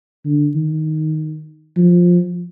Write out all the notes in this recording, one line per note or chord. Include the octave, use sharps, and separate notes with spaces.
D3
D#3
F3